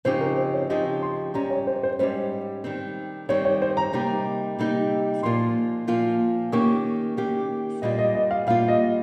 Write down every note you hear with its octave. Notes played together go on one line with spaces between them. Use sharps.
C#3 F3 C4 D#4 G4 C5
A#4
C5
C#5
C#3 F3 C4 D#4 G4 D#5
C6
G#2 G3 C#4 G4 A#5
C#5
C5
C5
G#2 G3 C#4 G4 C5
D#3 G3 C4
D#3 G3 C4 C#5
C#5
C5
A#5
C3 G3 A#3 D#4 G4
C3 G3 A#3 D#4 G4
A#2 F3 A#3 F4 C6
A#2 F3 A#3 F4
D#3 A#3 C#4 G4 C#6
D#3 A#3 C#4 G4
A#2 G3 A#3 F4 D#5
D#5
D#5
F5
A#2 G3 A#3 F4 F5
D#5